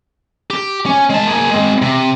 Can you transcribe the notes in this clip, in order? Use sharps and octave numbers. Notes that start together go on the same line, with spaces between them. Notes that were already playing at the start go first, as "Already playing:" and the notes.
G4
C#4
G#3 A5
A#3 G#4
G#3 C4
C3